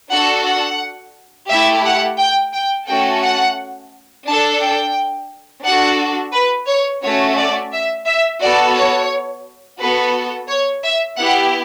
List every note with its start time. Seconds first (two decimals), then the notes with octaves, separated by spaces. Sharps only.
0.11 D4 F#4 A4 F#5
0.45 F#5
1.49 A3 E4 G4 E5
1.84 F#5
2.19 G5
2.53 G5
2.88 A3 C#4 F#4 A4 G5
3.22 F#5
4.26 D4 A4 A5
4.61 G5
5.64 D4 F#4 A4 F#5
6.33 B4
6.68 C#5
7.02 A3 C#4 F#4 C#5
7.38 D5
7.72 E5
8.07 E5
8.41 B3 F#4 A4 D5
8.76 C#5
9.79 B3 F#4 A4 B4
10.48 C#5
10.83 E5
11.17 B3 E4 G4 F#5